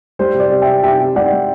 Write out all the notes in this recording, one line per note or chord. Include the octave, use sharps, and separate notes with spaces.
G3 C5
C3
D5
C3
E5 G5
C3
C3 E5 G5
C3
G3 D5 F#5
G3